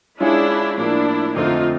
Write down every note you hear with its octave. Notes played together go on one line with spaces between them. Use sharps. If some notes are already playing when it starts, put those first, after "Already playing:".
G#3 C#4 D4 E4 F4 G#4 C#5
A2 F3 A#3 D4 E4
F2 D3 F3 A3 C4 D#4 F4